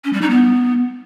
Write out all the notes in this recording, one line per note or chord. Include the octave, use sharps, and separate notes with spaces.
C#4
G3
D#4
B3